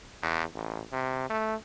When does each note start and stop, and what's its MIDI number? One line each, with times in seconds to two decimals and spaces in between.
0.22 0.42 40
0.55 0.82 33
0.93 1.25 48
1.30 1.55 57